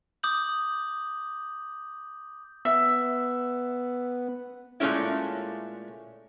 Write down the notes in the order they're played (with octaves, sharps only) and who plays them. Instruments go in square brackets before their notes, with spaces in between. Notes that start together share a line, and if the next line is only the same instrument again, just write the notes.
[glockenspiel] D6 D#6 G6 F#7
[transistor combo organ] B3 [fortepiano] E5
[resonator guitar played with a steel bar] A#2 G#3 A3 C#4 E4